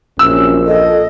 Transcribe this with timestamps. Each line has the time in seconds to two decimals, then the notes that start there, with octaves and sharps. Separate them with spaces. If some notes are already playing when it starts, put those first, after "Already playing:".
0.19 A#1 C3 F#3 C#4 E6
0.66 F4 A4 D#5